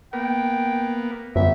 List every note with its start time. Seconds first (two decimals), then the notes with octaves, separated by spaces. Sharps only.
0.13 A#3 B3 G5
1.36 G1 F#2 E5